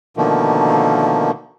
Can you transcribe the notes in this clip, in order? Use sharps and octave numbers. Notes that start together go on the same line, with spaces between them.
B2 D3 D#3 F3 A3 A#3